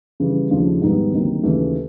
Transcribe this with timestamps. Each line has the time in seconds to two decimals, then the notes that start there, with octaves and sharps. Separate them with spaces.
0.20 C#3 E3 G3
0.50 D#2 C#3 F3 A3 D4
0.81 G#2 D#3 G3 B3 D#4
1.12 D2 C3 D#3 F#3 A#3
1.43 D#2 C#3 E3 A3